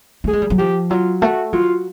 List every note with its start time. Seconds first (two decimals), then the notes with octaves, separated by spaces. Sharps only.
0.24 A3 G#4
0.33 G#3
0.42 G3
0.50 F#3
0.59 F3 G4
0.90 F#3 F4
1.21 A3 F#4
1.53 F#3 F4